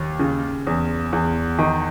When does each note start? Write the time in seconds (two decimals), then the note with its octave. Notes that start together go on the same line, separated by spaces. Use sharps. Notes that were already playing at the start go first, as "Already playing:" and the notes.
Already playing: D#2
0.19 C#3
0.67 E2
1.13 E2
1.59 D#3